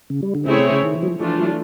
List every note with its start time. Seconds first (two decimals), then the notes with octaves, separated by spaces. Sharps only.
0.10 C#3
0.23 G3
0.35 D3
0.46 C#3 A3 C4 E4 G#4 C#5
0.59 C3
0.71 C#3
0.83 D#3
0.95 E3
1.03 F#3
1.08 F3
1.20 E3 F3 A3 D4 F4
1.38 F#3